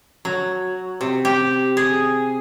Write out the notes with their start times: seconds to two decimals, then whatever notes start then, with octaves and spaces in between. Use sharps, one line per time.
0.25 F#3
1.01 C3
1.25 G4
1.77 G#4